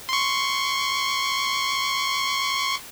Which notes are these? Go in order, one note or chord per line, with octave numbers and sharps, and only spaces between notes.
C6 C#6